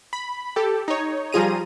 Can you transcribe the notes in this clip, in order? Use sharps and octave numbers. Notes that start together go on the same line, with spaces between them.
B5
G4 A4
D#4 C#5
F3 G3 F4 G#4 A#5 D#7